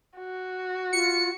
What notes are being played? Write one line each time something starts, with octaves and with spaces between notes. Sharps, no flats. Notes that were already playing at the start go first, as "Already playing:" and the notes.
F#4
F4 C#7